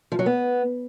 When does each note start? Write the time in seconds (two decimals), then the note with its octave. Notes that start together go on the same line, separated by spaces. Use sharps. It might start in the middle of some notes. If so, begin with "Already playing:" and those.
0.12 F3
0.19 F#3
0.26 B3